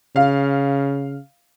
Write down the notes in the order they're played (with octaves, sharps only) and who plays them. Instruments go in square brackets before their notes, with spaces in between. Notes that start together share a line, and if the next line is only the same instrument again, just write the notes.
[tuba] C#3 [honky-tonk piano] F5